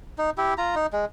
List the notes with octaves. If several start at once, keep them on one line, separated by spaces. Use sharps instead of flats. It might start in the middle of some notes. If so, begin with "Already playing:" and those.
D#4
E4 G4
F4 A#5
D#4
G#3